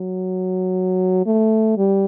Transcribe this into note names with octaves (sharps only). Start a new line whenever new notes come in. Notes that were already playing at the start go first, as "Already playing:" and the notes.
Already playing: F#3
A3
G3